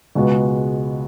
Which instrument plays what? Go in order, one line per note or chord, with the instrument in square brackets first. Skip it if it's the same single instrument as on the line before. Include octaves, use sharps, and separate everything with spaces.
[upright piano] C#2 B2 G#3 B3 F#4